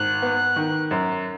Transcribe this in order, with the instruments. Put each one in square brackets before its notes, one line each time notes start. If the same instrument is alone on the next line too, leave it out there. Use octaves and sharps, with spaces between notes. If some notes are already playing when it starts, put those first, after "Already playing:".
Already playing: [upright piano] G#1 [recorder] F#6
[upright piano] B3
D#3
F#2